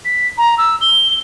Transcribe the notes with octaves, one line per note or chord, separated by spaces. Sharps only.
B6
A#5
E6
G7